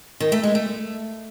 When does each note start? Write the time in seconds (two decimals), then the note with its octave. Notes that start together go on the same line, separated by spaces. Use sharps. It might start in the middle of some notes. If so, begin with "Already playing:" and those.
0.20 D#3
0.32 A3
0.43 G#3
0.55 A3